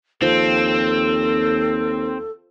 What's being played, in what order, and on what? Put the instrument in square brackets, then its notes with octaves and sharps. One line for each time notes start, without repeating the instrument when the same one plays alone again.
[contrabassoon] D#2 [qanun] F3 [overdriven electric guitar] C4 [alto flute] A4